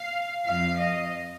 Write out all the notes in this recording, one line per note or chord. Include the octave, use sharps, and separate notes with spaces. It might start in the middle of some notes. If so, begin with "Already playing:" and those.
Already playing: F5
F2 F3 F5
D#5